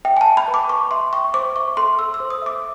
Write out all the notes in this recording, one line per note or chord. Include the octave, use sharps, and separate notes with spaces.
E5 G5
G#5
A5
G5
B5
B4
D6
B4 C#6
E5 C6
G5 C#6
C5 D6
E5 C#6
A4 C6
A4 E6
E6
C5
D#6
E5 D6